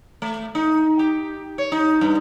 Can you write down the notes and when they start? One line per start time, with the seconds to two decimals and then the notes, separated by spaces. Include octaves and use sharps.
0.22 A3
0.55 D#4
0.99 G4
1.58 C#5
1.72 D#4
2.01 G2